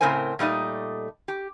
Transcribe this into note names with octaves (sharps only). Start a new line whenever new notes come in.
A2 C#3 C4 A#4 C5 G#5
A#2 G3 A3 D#4 D#5
G4